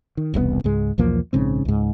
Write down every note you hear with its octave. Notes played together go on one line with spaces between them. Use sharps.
D#3
E1 C2 B2 B3
C#2 G#2 G#3
B1 E2 F3 A#3
A#1 G#2 C#3 C4
C#2 G#2